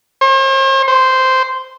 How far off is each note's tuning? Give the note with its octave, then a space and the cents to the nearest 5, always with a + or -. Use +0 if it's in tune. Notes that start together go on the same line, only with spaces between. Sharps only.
C5 +45
C5 -10